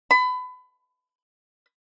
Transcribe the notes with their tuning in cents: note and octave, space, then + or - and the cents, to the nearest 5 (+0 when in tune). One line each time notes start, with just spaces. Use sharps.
B5 +25